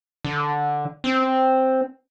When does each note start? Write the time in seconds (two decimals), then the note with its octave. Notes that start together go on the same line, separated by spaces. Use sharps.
0.25 D3
1.04 C4